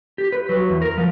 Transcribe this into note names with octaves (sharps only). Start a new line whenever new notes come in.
G4
B4
F#3
E2
A#4
F3